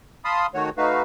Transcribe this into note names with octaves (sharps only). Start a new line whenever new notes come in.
F5 A5 B5 C6 D#6
D#3 A3 F#4 C#5
A3 D#4 F#4 B4 F5